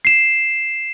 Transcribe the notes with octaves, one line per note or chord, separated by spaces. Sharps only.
C7 E7